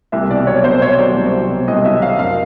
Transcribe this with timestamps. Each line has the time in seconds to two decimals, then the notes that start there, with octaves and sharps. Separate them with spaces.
0.12 C2 E5
0.30 B2 D5
0.47 F#3 C#5
0.64 B2 C5
0.82 B2 C#5
0.98 F#3 D5
1.16 C2
1.33 F#3
1.50 B2
1.68 C2 D#5
1.85 F#3 E5
2.02 F#3 F5
2.19 F#1 F5